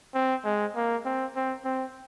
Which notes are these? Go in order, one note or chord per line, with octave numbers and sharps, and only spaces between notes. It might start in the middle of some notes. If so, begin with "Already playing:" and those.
C4
G#3
A#3
C4
C4
C4